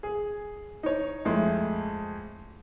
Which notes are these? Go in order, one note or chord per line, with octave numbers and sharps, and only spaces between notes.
G#4
D#4 C#5
F2 G#3 A3